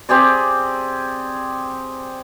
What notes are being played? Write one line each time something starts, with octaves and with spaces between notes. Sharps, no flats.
C4 G4 G#4 D5